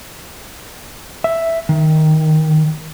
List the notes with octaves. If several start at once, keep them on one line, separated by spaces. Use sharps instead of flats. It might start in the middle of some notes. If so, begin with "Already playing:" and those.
E5
D#3